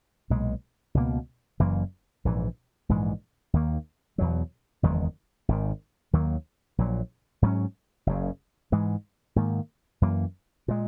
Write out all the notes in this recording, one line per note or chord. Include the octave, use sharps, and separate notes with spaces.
B1 A#2 G#3
C#2 B2 A#3
F#1 F#2 E3 A#3
A#1 G#2 E3
A#1 G#2 E3 G#3
D#2 D#3 A#3
E2 B2 F#3
F#1 E2 D#3 G#3
G#1 G#2 D#3
D#2 D#3 F#3 A#3
A#1 A#2 F#3
G#2 F#3 C#4
F#1 F#2 C#3
G#2 E3 G#3
G#2 D#3 A#3
F#2 E3 A#3
A#2 G#3